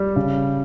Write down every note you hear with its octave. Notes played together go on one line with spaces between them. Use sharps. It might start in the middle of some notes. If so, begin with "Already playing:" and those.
Already playing: G3
C#3